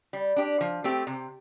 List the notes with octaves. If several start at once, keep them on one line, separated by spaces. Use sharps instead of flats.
G3
D4 G4
F3
A3 C4 G4
C3